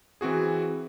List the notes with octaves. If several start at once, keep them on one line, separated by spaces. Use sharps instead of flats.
E3 C4 F#4 G#4